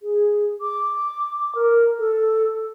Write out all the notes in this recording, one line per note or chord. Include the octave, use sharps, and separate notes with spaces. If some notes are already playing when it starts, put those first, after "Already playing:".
G#4
D6
A#4
A4